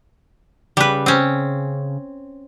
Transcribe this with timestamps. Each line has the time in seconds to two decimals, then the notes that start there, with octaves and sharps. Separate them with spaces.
0.77 C#3 G3 B4
1.06 C4 C#4